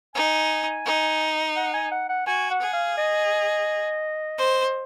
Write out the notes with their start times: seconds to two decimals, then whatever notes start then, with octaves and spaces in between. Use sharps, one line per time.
0.15 D#4 G#5
0.85 D#4
1.56 F#5
1.73 G#5
1.91 F#5
2.09 F#5
2.27 F#4 G#5
2.50 F#5
2.62 G#4
2.73 F5
2.97 D#5
4.39 C5